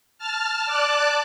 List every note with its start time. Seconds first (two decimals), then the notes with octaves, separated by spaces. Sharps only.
0.18 A5 F6
0.66 D5 A5 D6 F#6